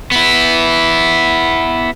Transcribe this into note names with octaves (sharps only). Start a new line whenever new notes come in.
B3 E4